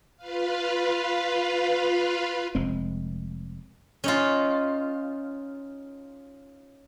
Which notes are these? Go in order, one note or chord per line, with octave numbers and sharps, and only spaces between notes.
F4 B4 F5
F1 G#3 C4
C#4 D#4 F4